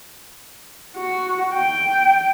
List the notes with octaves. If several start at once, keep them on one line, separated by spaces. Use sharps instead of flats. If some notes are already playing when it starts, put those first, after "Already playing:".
F#4
G5